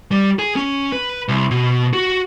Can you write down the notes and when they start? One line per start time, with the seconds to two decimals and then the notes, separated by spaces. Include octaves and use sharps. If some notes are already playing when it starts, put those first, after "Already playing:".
0.11 G3
0.39 G#4
0.56 C#4
0.92 B4
1.29 C2
1.51 B2
1.93 F#4